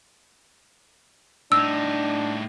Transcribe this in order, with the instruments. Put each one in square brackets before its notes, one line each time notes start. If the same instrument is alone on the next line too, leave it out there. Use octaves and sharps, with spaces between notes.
[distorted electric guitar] A2 D#4 [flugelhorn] D4 [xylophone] E6